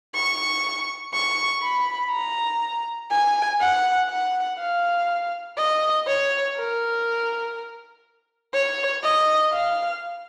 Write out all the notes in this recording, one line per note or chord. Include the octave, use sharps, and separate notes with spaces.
C#6
C#6
B5
A#5
G#5
F#5
F#5
F5
D#5
C#5
A#4
C#5
D#5
F5